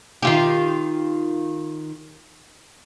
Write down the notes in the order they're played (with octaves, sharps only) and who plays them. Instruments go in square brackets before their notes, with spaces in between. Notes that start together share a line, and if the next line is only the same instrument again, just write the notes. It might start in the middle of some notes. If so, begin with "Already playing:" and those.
[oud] D#3 F4 G4